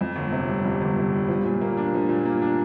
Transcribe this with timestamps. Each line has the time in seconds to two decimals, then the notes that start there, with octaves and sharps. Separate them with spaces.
0.01 F2
0.16 G1
0.32 C3
0.48 G3
0.65 F2
0.81 G1
0.97 C3
1.13 G3
1.28 F3
1.44 A#2
1.61 A#3
1.77 D4
1.93 F3
2.09 A#2
2.25 A#3
2.42 D4